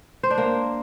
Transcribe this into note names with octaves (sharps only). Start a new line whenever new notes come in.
C5
D4
A#3